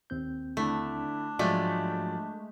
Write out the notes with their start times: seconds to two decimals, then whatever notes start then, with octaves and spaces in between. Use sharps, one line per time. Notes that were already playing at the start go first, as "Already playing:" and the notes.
0.10 D#2 C4 G6
0.57 D3 A3 D4 E4
1.39 G#2 F3 F#3 G#3 A3 F4 D5 G6